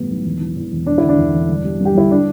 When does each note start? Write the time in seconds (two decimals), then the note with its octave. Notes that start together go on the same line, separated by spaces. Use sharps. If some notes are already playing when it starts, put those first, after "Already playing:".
Already playing: G1 A2 E3 G3 B3
0.10 B1
0.25 E1
0.40 E3
0.57 E2
0.72 E1
0.86 E1 D4
0.98 D3 E4
1.09 D4
1.19 E2
1.34 E1
1.50 G1
1.64 G3
1.81 G2 G4
1.95 G1 E4
2.11 D4